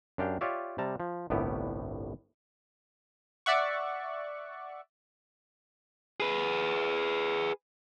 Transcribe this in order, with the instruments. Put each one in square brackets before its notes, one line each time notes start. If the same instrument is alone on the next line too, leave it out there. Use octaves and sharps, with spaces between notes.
[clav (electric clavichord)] F#2 D4 G4 F5 G5
F4 G4 C#5 D5 E5
C3 G3 A5 A#5
F3
G1 C2 A2 B3 G4
[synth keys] D5 E5 F#5 C#6
[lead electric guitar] G#4 B4